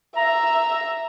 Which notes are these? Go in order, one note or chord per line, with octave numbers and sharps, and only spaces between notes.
E5 A#5